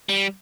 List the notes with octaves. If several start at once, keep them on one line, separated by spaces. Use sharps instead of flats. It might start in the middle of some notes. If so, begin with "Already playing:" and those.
G3